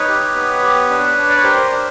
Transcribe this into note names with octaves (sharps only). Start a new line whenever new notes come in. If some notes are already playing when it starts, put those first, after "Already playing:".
Already playing: D#4 B4 C#5
G4
B3
G4
D4
D4
D5
C#5
G4 A#4 C5
D4